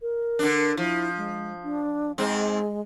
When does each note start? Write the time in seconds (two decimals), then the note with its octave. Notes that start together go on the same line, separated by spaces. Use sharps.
0.02 A#4
0.39 D3 D4
0.77 F3 E4
1.17 G#3
1.63 D4
2.18 G#2 G#3 C4